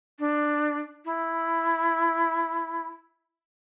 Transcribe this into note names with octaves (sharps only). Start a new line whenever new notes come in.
D4
E4